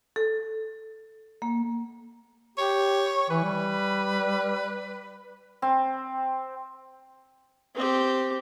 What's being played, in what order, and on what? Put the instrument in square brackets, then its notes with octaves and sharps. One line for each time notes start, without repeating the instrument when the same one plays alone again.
[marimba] A4
A#3
[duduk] G4 [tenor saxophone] C#5
[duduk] E3 [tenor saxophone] B4
[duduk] G3
[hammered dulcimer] C4
[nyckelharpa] C4 G4